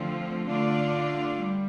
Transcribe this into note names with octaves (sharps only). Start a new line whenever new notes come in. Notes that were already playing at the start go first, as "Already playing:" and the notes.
Already playing: D3 F3 A3 C4 F4
D3 A3 D4 F4 D5
G3